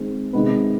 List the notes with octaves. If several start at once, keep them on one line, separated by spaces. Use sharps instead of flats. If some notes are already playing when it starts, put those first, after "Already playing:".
Already playing: D#3 G#3 C4
C3 D#3 G#3 B3